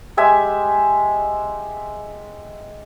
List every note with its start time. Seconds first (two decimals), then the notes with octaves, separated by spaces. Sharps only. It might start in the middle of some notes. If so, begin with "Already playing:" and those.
0.17 G#3 G4 E5 G#5